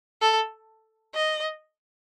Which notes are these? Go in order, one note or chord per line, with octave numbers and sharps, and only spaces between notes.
A4
D#5